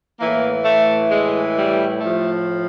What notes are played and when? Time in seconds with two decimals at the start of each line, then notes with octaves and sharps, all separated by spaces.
0.20 A2 E3 A#3
0.65 A3
1.10 G#3
1.55 G3
2.00 A2 F3 A3